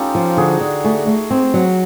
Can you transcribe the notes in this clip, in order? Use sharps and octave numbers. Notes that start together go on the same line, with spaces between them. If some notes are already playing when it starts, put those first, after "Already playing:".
Already playing: C#4 D#4 F4 G4 A4
F3
D3 F#4 G#4
D3
A3 F#4 G#4
A3
C4
F#3